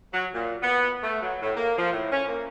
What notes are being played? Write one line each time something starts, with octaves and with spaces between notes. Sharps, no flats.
F#3
A#2
B3
A3
F#3
A2
A#3
F3
A2
C#4
A#3